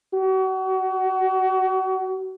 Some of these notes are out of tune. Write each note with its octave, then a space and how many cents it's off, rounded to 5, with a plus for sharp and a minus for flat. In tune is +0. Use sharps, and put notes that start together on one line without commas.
F#4 +35